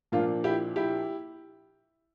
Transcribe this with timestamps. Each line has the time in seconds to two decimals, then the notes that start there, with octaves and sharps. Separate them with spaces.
0.12 A#2 F3 A#3 D4 F4
0.44 E4 G4
0.76 E4 G4